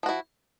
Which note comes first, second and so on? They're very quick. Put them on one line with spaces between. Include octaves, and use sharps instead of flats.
F3 F#4 E4